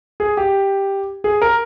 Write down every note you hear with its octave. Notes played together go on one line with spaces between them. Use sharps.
G#4
G4
G#4
A#4